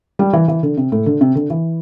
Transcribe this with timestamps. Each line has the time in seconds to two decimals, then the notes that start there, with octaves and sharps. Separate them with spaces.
0.19 G3
0.33 E3
0.48 E3
0.63 D3
0.77 C3
0.92 A2
1.06 D3
1.21 C3
1.35 D3
1.50 E3